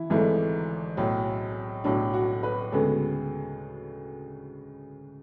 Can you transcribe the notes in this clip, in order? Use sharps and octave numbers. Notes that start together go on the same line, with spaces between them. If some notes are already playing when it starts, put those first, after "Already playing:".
Already playing: E3 E4
G#1 G#2 E3 A3
B1 A2 F#3
B1 A2 F#3 D4
F#4
B4
D2 C#3 G#3 B3 A4